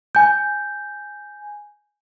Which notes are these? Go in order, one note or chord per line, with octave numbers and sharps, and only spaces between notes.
G#5 G6